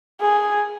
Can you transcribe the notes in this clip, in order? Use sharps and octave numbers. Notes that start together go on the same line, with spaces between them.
G#4